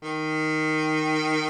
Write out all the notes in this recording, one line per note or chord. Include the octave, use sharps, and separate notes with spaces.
D#3